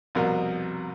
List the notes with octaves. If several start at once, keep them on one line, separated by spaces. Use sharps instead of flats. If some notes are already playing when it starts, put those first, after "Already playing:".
C2 F2 B2 A#4